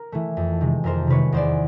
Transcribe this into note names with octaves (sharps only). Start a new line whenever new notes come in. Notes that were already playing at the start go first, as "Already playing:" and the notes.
Already playing: A#4
E3 A3
F2
C3 D#3 G#3
F2 A#4 C5
C3 D#3 G#3 B4 C#5
E2 C5 D5